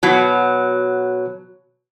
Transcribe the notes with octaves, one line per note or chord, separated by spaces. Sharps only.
B2 F#3